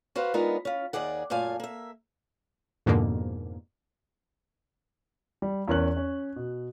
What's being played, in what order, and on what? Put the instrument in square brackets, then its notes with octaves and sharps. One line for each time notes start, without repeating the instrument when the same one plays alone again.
[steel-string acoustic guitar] F#4 B4 C5 F5
G#3 B3 D4 D#4 F4 A#4
C#4 F4
D#2 D#3 G#4 D5 F#5
F#2 A#2 A3 F5 G#5
A#3 E5
[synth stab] F2 G#2 B2 D3 A#3
[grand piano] G3
E2 E3 C#4 A#4 F#6 F#7
C#4
B2